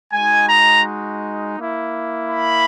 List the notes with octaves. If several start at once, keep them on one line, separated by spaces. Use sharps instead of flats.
G#3 D#4 F#4 G#5
A#5
A#3 E4
B5